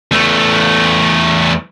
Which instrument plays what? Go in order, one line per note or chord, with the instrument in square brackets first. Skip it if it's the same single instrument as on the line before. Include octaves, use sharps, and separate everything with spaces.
[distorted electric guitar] E2 A3